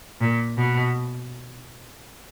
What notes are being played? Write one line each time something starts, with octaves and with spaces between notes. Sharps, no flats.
A#2
B2